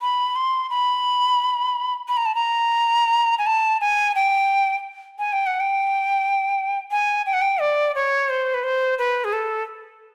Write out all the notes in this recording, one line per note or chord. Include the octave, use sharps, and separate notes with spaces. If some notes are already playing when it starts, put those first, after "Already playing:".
B5
C6
B5
B5
A#5
A5
A#5
G#5
A5
G#5
G5
G#5
G5
F#5
G5
G#5
G5
F#5
G5
D5
C#5
C5
B4
C5
B4
G#4
A4